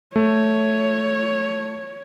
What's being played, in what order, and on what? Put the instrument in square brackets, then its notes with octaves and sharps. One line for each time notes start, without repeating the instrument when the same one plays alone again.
[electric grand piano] A3 [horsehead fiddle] C#5